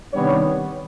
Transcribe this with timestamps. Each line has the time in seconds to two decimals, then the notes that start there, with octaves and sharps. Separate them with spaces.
0.13 C3 D#3 G3 B3 D4 C#5